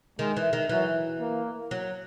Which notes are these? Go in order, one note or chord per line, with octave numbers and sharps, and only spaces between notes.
D#3 G#3
E3
D#3
E3 F#3
A#3
F#3